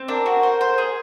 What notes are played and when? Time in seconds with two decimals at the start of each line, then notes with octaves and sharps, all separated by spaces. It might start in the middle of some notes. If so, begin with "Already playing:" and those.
Already playing: C4
0.08 D4 A#4
0.26 F#4
0.43 C5
0.61 C5
0.78 G#4